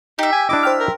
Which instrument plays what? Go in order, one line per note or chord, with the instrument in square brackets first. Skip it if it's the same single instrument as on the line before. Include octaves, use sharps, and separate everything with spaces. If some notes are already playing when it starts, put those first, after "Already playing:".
[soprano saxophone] D#4 [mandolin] G4 E5
[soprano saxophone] G#5
[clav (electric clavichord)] D4 E4 D#5 [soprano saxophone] D6
[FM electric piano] C5 G5 F6
[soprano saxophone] A#4